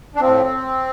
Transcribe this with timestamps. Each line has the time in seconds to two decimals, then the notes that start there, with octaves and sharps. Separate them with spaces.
0.16 D4
0.20 A2 F3 C4